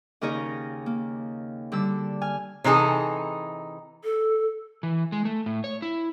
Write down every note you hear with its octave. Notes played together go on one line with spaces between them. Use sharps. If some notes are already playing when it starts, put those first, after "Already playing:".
D#2 C#3 D#4 A#4 C#5 D#5
A#3
D3 G3 E6
G#5 F6
C3 E3 D#4 G#4 A4
A4
E3
G#3
A3
A2
C#5
E4